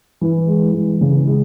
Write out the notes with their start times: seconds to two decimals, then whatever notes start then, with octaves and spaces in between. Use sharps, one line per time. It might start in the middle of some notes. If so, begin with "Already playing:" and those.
0.21 E3
0.48 G#3
0.74 E3
1.01 C#3
1.27 G#3